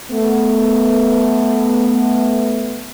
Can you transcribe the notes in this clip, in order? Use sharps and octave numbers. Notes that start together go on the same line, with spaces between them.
A3 B3